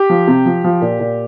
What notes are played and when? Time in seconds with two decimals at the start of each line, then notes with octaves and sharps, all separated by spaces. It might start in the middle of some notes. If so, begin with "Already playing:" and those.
Already playing: G4
0.10 F3
0.28 C3
0.46 F3
0.64 F3
0.82 A#2
1.00 A#2